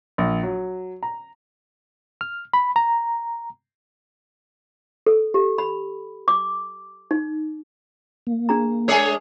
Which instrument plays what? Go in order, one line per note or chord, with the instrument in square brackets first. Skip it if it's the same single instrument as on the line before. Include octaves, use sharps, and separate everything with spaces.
[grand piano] A#1
F#3
A#5
[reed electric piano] F6
B5
A#5
[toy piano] A4
G4
B5
D6
D#4
[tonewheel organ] A#3
[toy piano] D4 G#4 A#5
[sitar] G#3 G#4 C#5 [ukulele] D4 G#5 [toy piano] A#4